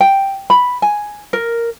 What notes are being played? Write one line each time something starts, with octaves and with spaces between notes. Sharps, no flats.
G5
B5
G#5
A#4